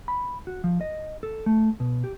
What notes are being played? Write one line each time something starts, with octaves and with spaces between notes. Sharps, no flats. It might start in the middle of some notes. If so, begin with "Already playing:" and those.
B5
F#4
F3
D#5
A4
A3
B2
G4